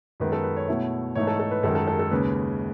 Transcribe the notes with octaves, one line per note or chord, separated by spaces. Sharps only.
F#2 D#3 G#3 B3 B4
A4
B4
C#5
B2 A3 E4
G#2 E3 A3 D#4 C#5
A4
A4
B4
F#2 D#3 G#3 A4
A4
A4
A4
D#2 C#3 G#3 B4